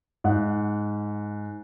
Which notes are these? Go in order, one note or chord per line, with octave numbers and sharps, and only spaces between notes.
G#2 F#5